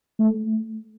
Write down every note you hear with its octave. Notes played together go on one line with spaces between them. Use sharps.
A3